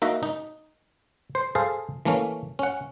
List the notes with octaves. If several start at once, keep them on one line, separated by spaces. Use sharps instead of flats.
A#3 D#4 F#4 E5 A#5
D#4
C5
G#4 A4 C5 F5
E3 A3 A#3 C#4
C#4 F#5